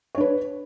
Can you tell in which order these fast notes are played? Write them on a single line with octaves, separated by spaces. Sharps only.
C#5 D4 B4